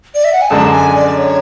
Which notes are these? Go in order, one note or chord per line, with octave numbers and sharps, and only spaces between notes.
D5
E5
F#5
G#5
F#2 D3 G#3 D4 A5
G#5
D5
C#5